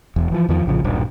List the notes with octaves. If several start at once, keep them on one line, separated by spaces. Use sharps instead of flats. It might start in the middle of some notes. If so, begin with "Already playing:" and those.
E1 E2
E3 F3
E2 D#3 F3
A#1 A2 C#3 F3
D#1 B1 G2